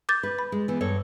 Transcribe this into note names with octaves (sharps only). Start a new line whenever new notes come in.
D6 G6 A6
B4
B5
G#3
E3 B3
G2 A4 C#5